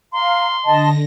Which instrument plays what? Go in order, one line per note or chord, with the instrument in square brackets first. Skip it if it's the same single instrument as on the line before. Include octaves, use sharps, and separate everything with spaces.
[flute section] F5 A#5 [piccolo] C6
[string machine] D3 A#6 [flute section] D#5 A5